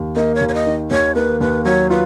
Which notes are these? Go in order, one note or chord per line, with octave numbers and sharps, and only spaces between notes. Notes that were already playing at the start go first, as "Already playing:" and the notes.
Already playing: D#2
A#3 D#5
C#5
D#2
C#5
D#5
D#3
D#2 C#5
A#3 B4
D#2 B4
F#3 C#5
F4 B4